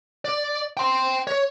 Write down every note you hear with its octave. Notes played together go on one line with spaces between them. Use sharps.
D5
G5 C6
C#5